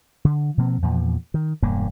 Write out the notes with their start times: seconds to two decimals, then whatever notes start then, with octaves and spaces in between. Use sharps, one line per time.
0.25 D3
0.57 B2 F3 A#3 C4
0.82 E2 A#2 F3
1.34 D#3
1.62 E1 G2 A#3